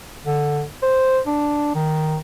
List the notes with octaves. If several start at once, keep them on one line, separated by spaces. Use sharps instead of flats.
D3
C5
D4
D#3